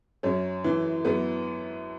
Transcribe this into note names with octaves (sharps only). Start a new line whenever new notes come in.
F#2 C#4
E3
F#2 B3